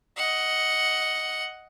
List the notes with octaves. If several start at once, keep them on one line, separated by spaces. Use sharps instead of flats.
D#5 F#5